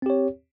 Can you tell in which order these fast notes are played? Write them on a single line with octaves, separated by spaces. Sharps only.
C4 G4 C#5